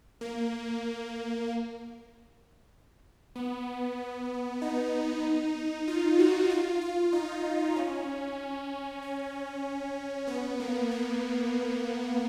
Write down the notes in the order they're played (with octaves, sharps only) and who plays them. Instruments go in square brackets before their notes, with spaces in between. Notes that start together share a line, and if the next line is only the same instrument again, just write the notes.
[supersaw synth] A#3
B3
D#4
F4
F#4
F4
F4
D#4
C#4
C#4
B3
A#3
B3